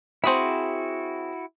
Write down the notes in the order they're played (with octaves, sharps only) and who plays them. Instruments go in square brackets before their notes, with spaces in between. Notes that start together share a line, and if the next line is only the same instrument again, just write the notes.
[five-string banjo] C4 G#4 B5 [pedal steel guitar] E4 F#4